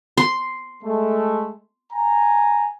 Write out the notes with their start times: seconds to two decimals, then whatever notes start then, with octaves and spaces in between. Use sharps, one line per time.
0.17 C6
0.83 G#3 A3
1.92 G#5 A#5